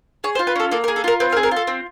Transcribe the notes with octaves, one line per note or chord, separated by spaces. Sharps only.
G#4 C#5
C5
F4
B4
C#4 A4
A#3 A4
A#4
G#4
A4
F4 A#4
C4 B4
A#4
G#4
A#4
F4
A4
C4